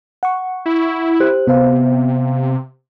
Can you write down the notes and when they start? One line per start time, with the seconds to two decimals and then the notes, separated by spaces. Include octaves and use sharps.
0.23 F#5 C#6
0.66 E4
1.20 G4 C5 F#6
1.47 C3 B3 C5 F5